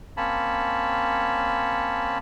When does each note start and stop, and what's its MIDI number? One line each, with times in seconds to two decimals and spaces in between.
0.17 2.18 58
0.17 2.18 60
0.17 2.18 61
0.17 2.18 73
0.17 2.18 81
0.17 2.18 83